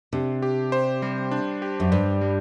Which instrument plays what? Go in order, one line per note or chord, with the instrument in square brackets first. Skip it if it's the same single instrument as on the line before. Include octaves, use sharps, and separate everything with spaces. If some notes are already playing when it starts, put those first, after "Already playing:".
[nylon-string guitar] C3 [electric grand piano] D4
[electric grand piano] G4
C5
G3
D4
G4
[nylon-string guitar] F#2
[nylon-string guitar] G2 [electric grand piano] C5
[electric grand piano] G3